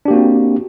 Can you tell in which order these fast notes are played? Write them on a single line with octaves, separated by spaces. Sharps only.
D4 G4 A#3 F#4 C4